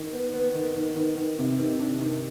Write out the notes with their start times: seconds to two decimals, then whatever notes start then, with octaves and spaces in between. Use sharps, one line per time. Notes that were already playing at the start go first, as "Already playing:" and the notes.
Already playing: D#3
0.13 B3
0.34 B3
0.55 D#3
0.76 D#3
0.96 D#3
1.17 D#3
1.39 C3
1.59 D#3
1.80 D4
2.01 D#3